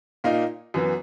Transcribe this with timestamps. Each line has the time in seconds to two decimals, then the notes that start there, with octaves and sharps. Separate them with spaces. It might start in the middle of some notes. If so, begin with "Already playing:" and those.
0.24 A#2 A#3 D#4
0.74 F#2 E3 B3